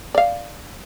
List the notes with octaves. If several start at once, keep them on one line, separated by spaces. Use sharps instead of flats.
D5 F5